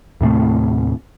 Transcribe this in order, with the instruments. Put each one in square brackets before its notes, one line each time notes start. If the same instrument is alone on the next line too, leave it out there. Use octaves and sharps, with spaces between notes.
[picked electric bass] D#2 A2 C3 A3